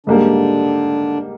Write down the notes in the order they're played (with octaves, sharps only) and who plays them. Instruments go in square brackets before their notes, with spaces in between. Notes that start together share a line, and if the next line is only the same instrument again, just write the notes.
[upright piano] G#2 G3 A#3 [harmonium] D3 D4